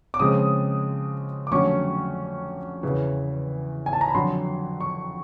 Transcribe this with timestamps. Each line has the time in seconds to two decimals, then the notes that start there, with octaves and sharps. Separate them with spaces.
0.14 D6
0.20 C#3 F3 G#3 C4 D#6
1.47 D6
1.52 F2 D3 F#3 A3 C#4 C#6
2.83 E2 C#3 E3
3.86 G#5
3.93 A5
4.01 A#5
4.08 B5
4.15 F2 D3 F#3 C6
4.81 C#6